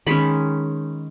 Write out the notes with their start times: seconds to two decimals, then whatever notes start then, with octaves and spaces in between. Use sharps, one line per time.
0.07 D#3 G#3 C#4 B5